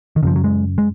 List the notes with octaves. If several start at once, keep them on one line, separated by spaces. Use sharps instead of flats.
D#3
F#2 C#3 F3
F#3
G#3
G#3